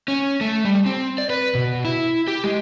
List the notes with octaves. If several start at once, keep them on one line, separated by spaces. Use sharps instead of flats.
C#4
A3
G3
C4
D5
B4
B2
E4
G4
G#3